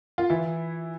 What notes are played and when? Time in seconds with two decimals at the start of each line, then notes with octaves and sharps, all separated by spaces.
0.18 F4
0.30 E3 E4